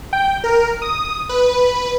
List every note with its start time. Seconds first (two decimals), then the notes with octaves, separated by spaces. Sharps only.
0.13 G5
0.44 A#4
0.82 D#6
1.29 B4